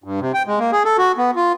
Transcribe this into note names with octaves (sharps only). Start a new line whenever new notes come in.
G2
C3
G5
G#3
A#3
G#4
A4
F#4
B3
F4